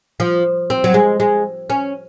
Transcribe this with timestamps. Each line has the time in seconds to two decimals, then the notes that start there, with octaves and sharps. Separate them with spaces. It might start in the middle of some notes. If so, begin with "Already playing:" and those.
0.20 F3
0.70 C4
0.84 F#3
0.94 G#3
1.20 G#3
1.70 C#4